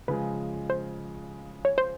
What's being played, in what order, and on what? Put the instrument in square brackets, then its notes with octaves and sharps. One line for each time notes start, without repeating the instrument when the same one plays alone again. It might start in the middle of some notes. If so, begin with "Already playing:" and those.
[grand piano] C#3 F3 G#3 [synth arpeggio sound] B4
[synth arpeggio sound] C5
C#5
C5